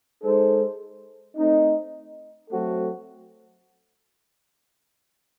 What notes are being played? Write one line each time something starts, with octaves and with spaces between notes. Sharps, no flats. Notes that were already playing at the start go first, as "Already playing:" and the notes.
G#3 D#4 A4 C5
A3 C4 D#4
F#3 A3 C4 F#4 A4